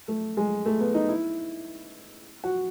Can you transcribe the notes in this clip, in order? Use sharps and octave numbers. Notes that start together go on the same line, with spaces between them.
A3
G#3
A3
B3
D#4
E4
F#4